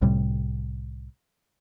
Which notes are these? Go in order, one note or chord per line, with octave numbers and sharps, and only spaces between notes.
C2 A2 C3 G3